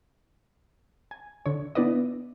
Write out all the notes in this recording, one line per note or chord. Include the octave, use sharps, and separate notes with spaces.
G#5
D3 C#5
B3 D4 E4 B4 D5 D#5